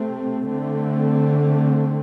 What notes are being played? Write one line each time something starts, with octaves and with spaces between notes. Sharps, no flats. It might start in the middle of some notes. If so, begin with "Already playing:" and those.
Already playing: C3 A3 C4
D3 A3 C4